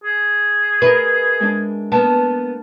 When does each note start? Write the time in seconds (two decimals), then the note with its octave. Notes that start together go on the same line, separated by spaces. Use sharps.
0.04 G#4
0.82 E4 A#4 B4
1.40 G#3 D4
1.92 A#3 B3 A5